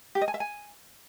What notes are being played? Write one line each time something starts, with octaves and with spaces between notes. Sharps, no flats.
G4
D#5
G#5
E5
G#5